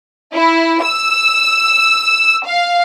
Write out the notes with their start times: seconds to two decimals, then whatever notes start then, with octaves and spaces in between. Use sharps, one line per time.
0.34 E4
0.83 E6
2.46 F5